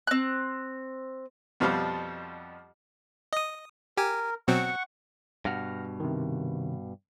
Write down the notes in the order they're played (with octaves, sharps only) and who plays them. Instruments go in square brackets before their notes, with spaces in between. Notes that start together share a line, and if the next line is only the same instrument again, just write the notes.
[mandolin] C4 F#6
[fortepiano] F2 B2 F3 G3 F5
[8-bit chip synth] D#5 D#6
[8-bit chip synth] G4 G#5 [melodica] A#4
[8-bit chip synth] B2 F#3 C4 [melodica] F#5 C#6
[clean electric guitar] G2 B2 [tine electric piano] F#5 F6 A#6
[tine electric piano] C3 D#3